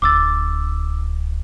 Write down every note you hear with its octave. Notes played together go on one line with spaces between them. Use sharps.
D1 D6 E6 A6